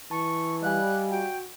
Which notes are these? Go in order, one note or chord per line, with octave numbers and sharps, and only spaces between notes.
E3 A5 C#6
G3 D#5 F5 G#5 F#6
F#4 G5